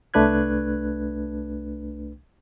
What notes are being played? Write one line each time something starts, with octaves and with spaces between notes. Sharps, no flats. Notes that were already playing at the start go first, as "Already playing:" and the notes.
C2 A3 D4 B4 F#6 G#6